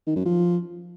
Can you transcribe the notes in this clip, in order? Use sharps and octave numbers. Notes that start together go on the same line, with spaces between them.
D#3
F#2
F3